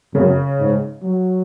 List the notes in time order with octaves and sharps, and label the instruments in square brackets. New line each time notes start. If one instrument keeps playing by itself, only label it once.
[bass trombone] F#2 [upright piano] C#3
[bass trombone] G#2
F#3